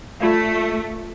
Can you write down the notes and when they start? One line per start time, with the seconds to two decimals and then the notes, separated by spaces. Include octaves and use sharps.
0.20 A3 F4 D5 F5